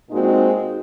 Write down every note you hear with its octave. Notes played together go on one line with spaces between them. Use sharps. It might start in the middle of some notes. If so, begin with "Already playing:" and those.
A#2 G#3 C4 D#4 F#4